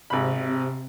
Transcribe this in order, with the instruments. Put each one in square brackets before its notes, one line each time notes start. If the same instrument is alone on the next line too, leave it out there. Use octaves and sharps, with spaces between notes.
[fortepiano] G#1 B5 [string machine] C3